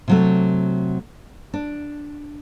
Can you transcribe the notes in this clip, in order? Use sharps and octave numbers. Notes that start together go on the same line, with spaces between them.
C3 F#3 A3
D4